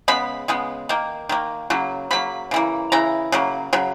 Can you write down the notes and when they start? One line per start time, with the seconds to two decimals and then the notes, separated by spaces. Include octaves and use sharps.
0.08 C#3 G#3 B3 B5
0.48 C#3 G#3 B3
0.89 D#3 A#3
1.29 D#3 A#3
1.70 C#3 F#3 A#3
2.11 C#3 F#3 A#3 B5
2.51 C#3 E3 A#3
2.92 C#3 E3 A#5
3.32 C#3 F#3 A#3
3.73 C#3 F#3